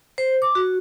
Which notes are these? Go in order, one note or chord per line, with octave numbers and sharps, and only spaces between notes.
C5
D6
F#4